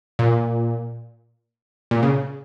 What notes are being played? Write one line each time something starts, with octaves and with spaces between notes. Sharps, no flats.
A#2
A#2
C#3